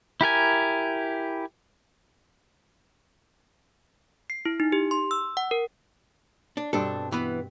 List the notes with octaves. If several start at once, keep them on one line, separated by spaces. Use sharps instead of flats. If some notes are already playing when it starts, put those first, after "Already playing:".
E4 G4 A#4 G#5
C7
E4
D#4
G4
C6
E6
F#5
A#4
D4
G2 B2 C4 D4 A4
E3 B3